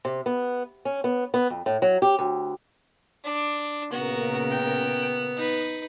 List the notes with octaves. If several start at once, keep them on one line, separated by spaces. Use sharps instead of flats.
C3
B3
C#4
B3
B3
F2
A2
F#3
G4
D2
D4
A#2 C#3 B3 F#4 A#4
G5
D#4 B4